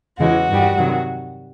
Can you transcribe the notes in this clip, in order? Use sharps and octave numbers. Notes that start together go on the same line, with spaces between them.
E2 C#3 E3 G#3 F#4
G2 D#3 G3
C3 D#3 F#3